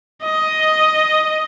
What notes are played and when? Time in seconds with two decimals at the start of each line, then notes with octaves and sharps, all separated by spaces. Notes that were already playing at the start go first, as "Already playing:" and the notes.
0.23 D#5